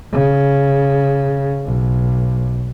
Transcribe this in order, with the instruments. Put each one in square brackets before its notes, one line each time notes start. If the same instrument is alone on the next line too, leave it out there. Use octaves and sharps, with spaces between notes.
[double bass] C#3
B1